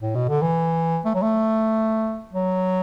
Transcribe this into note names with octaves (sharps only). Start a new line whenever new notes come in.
A2
B2
D3
E3
A3
F#3
A3
F#3